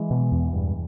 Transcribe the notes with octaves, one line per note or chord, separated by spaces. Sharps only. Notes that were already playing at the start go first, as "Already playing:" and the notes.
Already playing: E3 G#3
B2
E2
G2